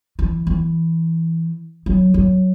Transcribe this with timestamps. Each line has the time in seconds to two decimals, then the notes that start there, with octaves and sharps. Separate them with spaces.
0.19 E3
0.47 E3
1.86 F#3
2.14 F#3